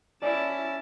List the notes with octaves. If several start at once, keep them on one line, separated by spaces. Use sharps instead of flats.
C#4 E4 D5 A5